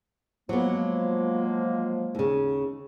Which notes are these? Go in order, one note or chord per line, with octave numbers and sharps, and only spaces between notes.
F3 F#3 G#3 A#3 B3
D#2 C#3